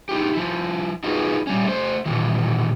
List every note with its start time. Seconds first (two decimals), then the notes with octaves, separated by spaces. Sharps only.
0.09 D#4 E4 G4
0.35 F3 E4
1.04 D#4 F4 F#4 G#4 B4
1.47 G3 C#4
1.64 A3 C5
2.06 A#2 D#3 E3